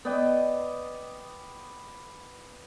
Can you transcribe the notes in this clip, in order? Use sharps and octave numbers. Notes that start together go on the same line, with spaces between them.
B3 D5 D#5 G5